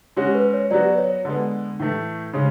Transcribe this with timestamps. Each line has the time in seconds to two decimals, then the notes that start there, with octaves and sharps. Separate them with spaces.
0.16 G#3 C#4 F#4 C#5
0.35 B4
0.53 C#5
0.71 F#3 B3 F#4 D5
0.90 B4
0.98 C#5
1.25 D3 G#3 B3
1.79 A2 E3 A3
2.33 C#3 G#3 C#4 C#5